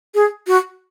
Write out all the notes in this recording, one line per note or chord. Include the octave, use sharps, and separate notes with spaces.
G#4
F#4